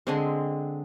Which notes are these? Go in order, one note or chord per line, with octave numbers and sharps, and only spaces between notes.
D3 G#3 C4